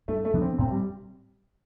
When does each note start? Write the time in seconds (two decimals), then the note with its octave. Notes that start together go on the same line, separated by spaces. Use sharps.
0.08 G2 A3
0.25 A3
0.34 F3 B3 D4
0.42 C4
0.58 A2 C4
0.71 G3